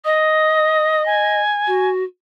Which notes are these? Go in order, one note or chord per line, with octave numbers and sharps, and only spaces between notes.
D#5 D#6
G#5
F#4